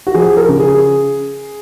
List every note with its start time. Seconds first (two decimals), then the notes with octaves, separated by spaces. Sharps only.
0.07 F#4
0.14 F3 G#4
0.37 A#4
0.49 C#3
0.60 G#4